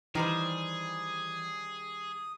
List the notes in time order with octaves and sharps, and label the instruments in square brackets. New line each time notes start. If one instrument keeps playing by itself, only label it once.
[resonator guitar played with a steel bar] D#3 G3 C5 [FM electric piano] E3 [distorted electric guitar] G#4 [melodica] D#6